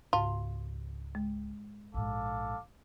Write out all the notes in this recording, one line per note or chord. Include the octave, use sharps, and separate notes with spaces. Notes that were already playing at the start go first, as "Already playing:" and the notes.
C#2 G#2 F4
G#3
A#1 G#2 A4 F5 D6